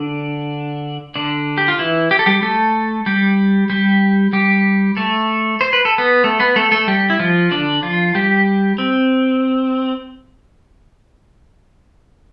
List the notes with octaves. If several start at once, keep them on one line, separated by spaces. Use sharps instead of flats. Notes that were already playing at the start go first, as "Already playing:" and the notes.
Already playing: D3 D4
D3 D4
G4
F4
E3 E4
G4
A4
G3 G4
A3 A4
G3 G4
G3 G4
G3 G4
A3 A4
C5
B4
A4
B3 B4
A3 A4
B3 B4
A3 A4
A3 A4
G3 G4
E4
F3 F4
D3 D4
F3 F4
G3 G4
C4